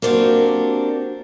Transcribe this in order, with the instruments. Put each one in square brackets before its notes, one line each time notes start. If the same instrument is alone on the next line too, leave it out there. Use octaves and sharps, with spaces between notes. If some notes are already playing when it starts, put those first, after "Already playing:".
[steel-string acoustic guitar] A#3 C4 D4 F#4 G4